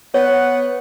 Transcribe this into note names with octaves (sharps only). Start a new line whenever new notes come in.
B3 C#5 F#5